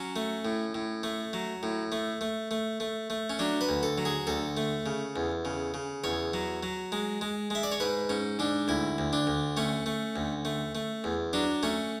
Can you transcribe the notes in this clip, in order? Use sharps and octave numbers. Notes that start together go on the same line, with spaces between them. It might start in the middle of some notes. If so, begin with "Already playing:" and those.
Already playing: F#3 C#4
A3
A2
A2
A3
F#3
A2
A3
A3
A3
A3
A3
C#4
F#3 D4
B4
D2
A4
F#3
G#4
D2 A4
A3
C#3
E2
C#3
C#3
E2 C#5
F#3
F#3
G#3
G#3
G#3 E5
D5
C#5
G#2 B4
G#2 C#4
G#2 D4
D2 E4
D2
D4
D2
A3 C#4
A3
D2
A3
A3
E2
F#3 D4
A3 C#4